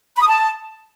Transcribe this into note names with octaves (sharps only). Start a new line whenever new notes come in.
B5
D#6
A5